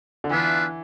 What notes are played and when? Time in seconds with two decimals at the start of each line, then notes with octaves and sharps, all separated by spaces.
0.24 D3
0.30 E3 B3 D4 F4 B4 E5